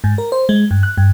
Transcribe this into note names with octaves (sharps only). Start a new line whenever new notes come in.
G#2
A#4
C5
G#3
G2
F#6
G2